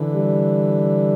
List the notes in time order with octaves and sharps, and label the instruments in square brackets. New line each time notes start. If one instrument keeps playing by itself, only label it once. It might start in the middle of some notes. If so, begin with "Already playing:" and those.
Already playing: [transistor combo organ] D3 E3
[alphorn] G3